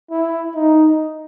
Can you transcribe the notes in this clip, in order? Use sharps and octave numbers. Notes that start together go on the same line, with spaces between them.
E4
D#4